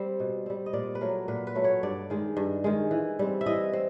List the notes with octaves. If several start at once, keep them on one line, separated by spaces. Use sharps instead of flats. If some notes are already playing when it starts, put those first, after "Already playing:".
Already playing: G3 C4
B2
G3 C4
D#5
A#2 D5
B4
F#3 A3 A#4
A#2 B4
B4
F#3 A3
C#5
G2 D5
D#3 G#3
G2
D#3 G#3
E3
G3 C4
E5
E3 D#5
C4